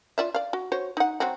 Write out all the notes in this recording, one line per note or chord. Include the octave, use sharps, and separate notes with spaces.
F4 D5 E5
D5 F5
F#4
F#4 C5 C#5
D#4 F#5
F#3 C4 F#4